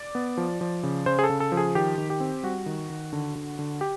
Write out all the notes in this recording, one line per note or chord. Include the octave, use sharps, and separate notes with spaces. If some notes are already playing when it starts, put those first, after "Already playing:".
Already playing: D5
B3
F3
F3
C#3
C#3 C5
G#4
A4
C#3
A4
F3
G#4
D#3 G4
D#3
G4
C4
G3 F#4
D#3
D#3
D3
D3
D3
G4